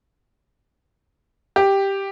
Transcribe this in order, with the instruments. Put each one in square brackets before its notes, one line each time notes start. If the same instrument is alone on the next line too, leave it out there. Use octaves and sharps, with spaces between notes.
[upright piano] G4